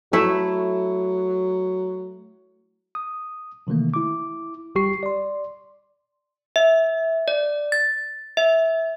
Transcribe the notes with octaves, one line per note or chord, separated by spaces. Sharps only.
F#3 A3 E4
D#6
C3 D#3 E3 A3 A#3
E4 D6
G1 G3 G4 C#6 C7
D5 C6
E5
D5
A6
E5